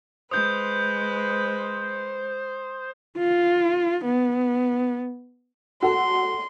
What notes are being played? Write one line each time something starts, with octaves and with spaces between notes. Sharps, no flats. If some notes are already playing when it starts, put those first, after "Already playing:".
G#3 B4 C5 D#6 G6
F4
B3
F#4 A4 C6